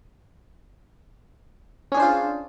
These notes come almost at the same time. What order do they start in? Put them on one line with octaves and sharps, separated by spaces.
C#4 G#4 D4 C5 F4